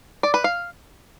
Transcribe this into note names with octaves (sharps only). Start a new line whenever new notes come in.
D5
B4
F5